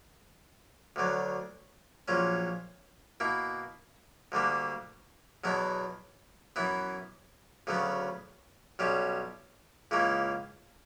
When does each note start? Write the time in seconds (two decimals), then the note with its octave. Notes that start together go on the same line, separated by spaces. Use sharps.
0.96 D2 D3 F#3
2.08 A#1 A#2 F#3 C#4
3.20 B2 A#3 E4
4.32 D2 D3 G3 A#3
5.44 E2 B2 F#3 B3 E4
6.56 F#2 E3 B3 E4
7.67 D2 C#3 F#3 B3
8.79 B1 B2 G3 C#4
9.91 C#2 C#3 E3 A#3 C#4